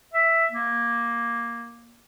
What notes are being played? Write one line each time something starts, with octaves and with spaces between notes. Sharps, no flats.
E5
A#3